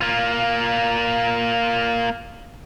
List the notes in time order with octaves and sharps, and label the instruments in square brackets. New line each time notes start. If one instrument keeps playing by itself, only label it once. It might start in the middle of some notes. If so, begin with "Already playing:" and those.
[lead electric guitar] A#3 F4